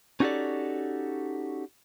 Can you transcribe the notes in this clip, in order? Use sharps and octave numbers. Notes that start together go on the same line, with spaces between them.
C#4 D#4 F#4 G4 A4 D5